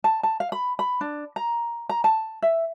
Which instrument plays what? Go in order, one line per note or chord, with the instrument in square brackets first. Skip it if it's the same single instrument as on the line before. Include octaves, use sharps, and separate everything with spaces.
[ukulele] A5
A5
F5
B5
B5
D4
A#5
A#5
A5
E5